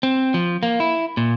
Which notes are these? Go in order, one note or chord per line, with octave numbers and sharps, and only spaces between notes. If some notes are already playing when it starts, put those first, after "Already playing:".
C4
F3
A#3
E4
A#2